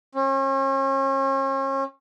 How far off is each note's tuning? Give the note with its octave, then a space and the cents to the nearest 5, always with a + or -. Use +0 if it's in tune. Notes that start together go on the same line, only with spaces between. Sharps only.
C#4 -40